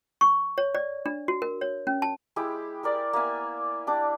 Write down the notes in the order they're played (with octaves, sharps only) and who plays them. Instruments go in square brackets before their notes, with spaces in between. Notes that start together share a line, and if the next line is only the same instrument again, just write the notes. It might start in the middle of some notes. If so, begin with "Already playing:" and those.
[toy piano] C#6
C#5
D5
D4
F#4
A#4
C#5
C#4
A5
[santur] G#3 E4 G4 B5
G4 A#4 D5 G5
A#3 B3 E5 G#5
D4 G4